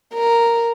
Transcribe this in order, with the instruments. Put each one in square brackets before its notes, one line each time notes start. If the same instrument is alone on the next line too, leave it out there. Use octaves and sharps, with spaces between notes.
[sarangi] A#4